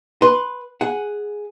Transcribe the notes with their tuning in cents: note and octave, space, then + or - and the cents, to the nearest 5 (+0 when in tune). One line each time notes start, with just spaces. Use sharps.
B4 +0 C6 +0
G#4 +0 F#5 +0